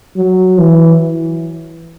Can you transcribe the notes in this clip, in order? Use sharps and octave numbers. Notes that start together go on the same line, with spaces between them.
F#3
E3